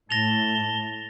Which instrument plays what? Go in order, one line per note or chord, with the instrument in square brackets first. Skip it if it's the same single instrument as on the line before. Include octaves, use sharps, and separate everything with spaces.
[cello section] A2 [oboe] A5 [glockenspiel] A#6 F7 [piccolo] G7